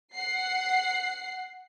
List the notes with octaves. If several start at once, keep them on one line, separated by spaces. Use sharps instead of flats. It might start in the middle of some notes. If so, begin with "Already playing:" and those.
F#5 C7